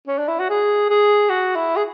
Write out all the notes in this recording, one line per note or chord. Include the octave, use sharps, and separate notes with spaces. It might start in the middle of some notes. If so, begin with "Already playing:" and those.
C#4
D4
E4
F#4
G#4
G#4
F#4
E4
G#4